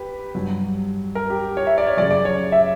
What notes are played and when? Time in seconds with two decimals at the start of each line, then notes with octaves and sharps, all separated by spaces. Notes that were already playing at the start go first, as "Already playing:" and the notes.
Already playing: G4 B4
0.35 G2 F#3
1.15 A#4
1.30 G4
1.57 C#5
1.67 E5
1.78 D5
1.87 C#5
1.97 F#2 C#3 F#3 D5
2.11 D5
2.25 C#5
2.52 E5